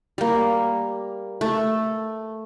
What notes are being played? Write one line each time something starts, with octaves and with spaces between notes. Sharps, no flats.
G3 A#3
A3